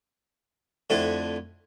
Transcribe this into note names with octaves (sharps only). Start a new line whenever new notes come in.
F2 D3 A3 E4